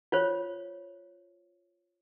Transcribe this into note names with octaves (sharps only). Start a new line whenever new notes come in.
F4 C5 C#5